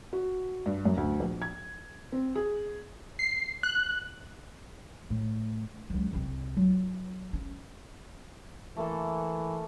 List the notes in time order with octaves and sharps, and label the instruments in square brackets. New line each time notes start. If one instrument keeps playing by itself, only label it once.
[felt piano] F#4
G2
F#2
D2
A#1
G#6
C4
G#4
[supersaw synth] C7
F#6
[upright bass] A2
C#2 F#3
C2 C3
F#3 F4
C#4
[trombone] E3 [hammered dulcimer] A3 A#3 A4